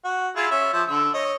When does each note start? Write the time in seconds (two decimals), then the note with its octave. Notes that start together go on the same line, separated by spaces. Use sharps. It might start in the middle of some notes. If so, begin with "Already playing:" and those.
0.04 F#4
0.36 E4 F4 G#4
0.51 C#4 E5
0.73 F3 E5
0.88 D3 E6
1.14 C#5 D#5